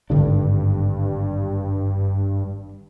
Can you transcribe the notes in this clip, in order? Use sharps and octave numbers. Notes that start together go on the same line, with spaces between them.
G#1 G2 D3 D4